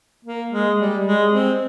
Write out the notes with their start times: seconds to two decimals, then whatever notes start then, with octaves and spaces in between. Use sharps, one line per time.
0.25 A#3
0.52 G#3
0.79 G3
1.06 G#3
1.33 C4